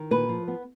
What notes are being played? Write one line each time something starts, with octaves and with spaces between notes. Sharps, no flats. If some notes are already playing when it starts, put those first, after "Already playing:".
Already playing: D#3
A#2 B4
F3
B3